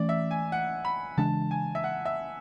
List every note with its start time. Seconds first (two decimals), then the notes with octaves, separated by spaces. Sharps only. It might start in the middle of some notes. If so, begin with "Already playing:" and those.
Already playing: E3 A3 C#4 D5
0.09 E5
0.31 G#5
0.52 F#5
0.85 B5
1.18 C#3 E3 G#3 D4 A5
1.51 G#5
1.75 E5
1.84 F#5
2.05 E5